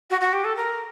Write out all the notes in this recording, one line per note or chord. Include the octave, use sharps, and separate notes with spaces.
F#4
F#4
G4
A4
A#4